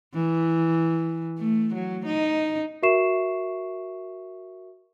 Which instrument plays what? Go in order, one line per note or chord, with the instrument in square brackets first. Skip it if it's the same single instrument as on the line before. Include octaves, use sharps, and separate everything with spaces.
[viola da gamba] E3
A3
F#3
D#4
[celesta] F#4 A#4 E5 C#6 C7 E7